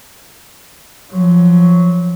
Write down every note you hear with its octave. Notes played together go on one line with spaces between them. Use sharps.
F3 F#3